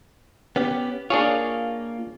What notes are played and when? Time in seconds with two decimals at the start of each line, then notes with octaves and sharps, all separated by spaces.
0.56 B3 C#4 G4
1.10 A#3 D4 F4 G#4 C#5